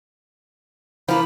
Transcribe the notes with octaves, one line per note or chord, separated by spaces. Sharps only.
E3 F3 A#3 B5